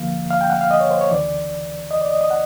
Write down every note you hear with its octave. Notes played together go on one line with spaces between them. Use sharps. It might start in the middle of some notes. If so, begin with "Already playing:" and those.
Already playing: D2 D3 F3 A#3 F5
F5
G5
F#5
F5
D#5
C#5
C5
C#5
D2 C#3 E3 D5
D#5
D5
D#5
D#5
F#5